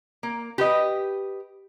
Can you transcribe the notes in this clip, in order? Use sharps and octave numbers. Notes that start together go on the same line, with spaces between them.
A#3
G4 B4 D#5